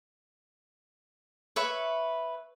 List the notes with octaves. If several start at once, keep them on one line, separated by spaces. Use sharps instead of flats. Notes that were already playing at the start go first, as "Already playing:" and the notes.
B4 C#5 E5 C#6